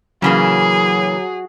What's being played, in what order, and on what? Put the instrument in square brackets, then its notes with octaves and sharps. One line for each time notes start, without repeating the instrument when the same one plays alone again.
[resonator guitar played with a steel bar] C#3 E3 A#3 [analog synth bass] F#3 [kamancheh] G#4